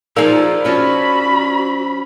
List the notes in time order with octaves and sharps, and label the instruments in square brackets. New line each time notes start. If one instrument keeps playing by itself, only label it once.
[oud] F3 G#4 A#4 [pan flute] D#4 [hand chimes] D5 F5 E6
[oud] F3 C#4 D4 [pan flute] F#4 [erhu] B5